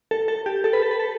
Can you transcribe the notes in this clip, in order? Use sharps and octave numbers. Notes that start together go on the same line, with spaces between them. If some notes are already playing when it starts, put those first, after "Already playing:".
A4
A4
G4
A4
B4
A4
B4
A4